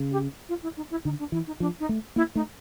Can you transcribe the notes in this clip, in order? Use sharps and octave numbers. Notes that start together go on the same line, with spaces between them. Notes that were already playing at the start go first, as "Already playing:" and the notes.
Already playing: C#3
G4
F4
E4
D#4
E4
D3 D#4
D4
E3 E4
D#4
F3 D4
D#4
A3
A#3 E4
A3 D#4